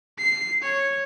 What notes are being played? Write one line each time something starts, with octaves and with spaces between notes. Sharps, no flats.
C7
C#5